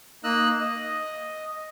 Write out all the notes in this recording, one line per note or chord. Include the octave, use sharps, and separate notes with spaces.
A#3 D#4 D#5 E6 F#6
D#5